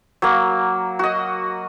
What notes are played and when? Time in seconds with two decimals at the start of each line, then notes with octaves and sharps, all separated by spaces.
0.22 F#3 A#3
0.99 F#4 D#5